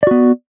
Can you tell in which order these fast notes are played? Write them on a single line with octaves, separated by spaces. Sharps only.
D5 F#4 B3